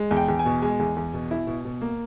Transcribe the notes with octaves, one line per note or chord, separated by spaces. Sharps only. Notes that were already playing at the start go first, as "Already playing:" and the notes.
Already playing: G#3
E2
G5
E2
G#5
B2
G#3 G#5
E2
E2
B2
E4
B2
B2
A#3